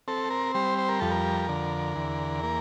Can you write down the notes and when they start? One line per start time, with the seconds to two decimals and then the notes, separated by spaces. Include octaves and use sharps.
0.08 C4 A4
0.30 A#4
0.55 G3 C5
0.78 C5
0.89 A#4
1.00 F2 A4
1.11 A#4
1.49 D3
1.96 E2
2.43 A#3